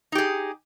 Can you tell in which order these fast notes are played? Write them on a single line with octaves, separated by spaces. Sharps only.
D#4 G4 G#4